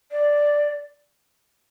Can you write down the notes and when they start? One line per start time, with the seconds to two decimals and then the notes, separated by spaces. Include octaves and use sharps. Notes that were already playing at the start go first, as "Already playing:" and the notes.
0.11 D5